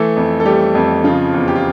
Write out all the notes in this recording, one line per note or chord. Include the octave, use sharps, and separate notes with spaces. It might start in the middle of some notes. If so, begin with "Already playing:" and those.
Already playing: E3 A3 A4
F2
A4
G3 A3 G4
F2
C#3 F3 F4
E2
G4
F4